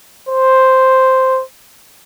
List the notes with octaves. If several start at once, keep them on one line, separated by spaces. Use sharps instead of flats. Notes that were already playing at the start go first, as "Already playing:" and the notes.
C5